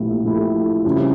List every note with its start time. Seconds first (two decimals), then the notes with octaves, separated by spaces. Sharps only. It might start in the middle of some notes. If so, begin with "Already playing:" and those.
Already playing: A#1 A#2 A3 E4 G4
0.24 A#1 A#2 A3 E4 G4
0.85 F2 C#3 G3 C#4 E4